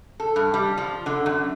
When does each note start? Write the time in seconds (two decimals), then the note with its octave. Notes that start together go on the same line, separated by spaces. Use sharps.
0.20 A4
0.36 G2
0.54 G3
0.77 F3
1.06 D3
1.26 F#2